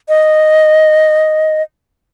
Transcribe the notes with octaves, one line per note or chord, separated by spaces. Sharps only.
D#5